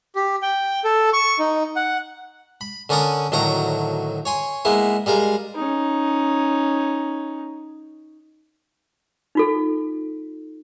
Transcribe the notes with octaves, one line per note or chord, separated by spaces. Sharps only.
G4
G5
A4
C#6
D#4
F#5
B5
D3 C#4 A#4 D5 C#6 D#6
D2 A2 D#3 F#3 A#5 C#6
C#5 G#5 C6
G#3 A#3 B3 E4
G3 G#3 A#4 F5
C#4 D#4
D#4 F4 A4